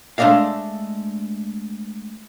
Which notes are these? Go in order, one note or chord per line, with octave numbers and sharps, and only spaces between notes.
G#3 A3 C4 D4 D#5 F5